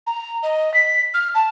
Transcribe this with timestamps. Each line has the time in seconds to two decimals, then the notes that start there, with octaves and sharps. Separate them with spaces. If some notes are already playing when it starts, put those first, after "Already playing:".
0.07 A#5
0.43 D#5
0.74 B6
1.14 F6
1.35 A5